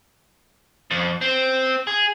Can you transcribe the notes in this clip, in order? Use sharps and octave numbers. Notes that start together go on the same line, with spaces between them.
F2
C4
G#4